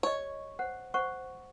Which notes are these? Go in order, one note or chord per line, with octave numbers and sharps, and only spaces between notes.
G4 C#5 D#5
C5 F#5
C5 F#5 C#6